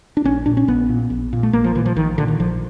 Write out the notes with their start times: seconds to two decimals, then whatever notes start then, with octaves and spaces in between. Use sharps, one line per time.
0.17 D4
0.24 A#1 C#4
0.46 A#2 D4
0.57 C#4
0.68 A#1 B3
0.89 A#2
1.10 A#1
1.33 A#2
1.43 A3
1.53 A#1 A#3
1.64 F3
1.75 A#2 E3
1.86 F3
1.96 A#1 D#3
2.18 A#2 D3
2.28 D#3
2.39 A#1 F3